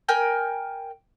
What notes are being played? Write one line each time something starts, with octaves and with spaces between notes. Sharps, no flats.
A#4 G5 G#5 G6